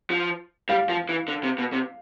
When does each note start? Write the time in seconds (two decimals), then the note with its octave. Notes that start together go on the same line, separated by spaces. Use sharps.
0.10 F3
0.69 G3 F5
0.89 F3
1.09 E3
1.28 D3
1.44 C3
1.58 B2
1.73 C3